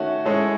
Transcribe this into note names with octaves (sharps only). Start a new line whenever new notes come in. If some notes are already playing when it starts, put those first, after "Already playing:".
Already playing: D#3 A3 C#4 F#4
G#3 C#4 E4 A4